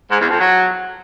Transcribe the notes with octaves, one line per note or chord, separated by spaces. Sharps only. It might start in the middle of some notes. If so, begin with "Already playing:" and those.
G#2
E2
F2
F#3